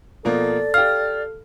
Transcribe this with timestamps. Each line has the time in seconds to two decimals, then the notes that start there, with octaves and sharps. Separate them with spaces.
0.25 B2 F3 A#3 A4 D5
0.74 G4 F5 F6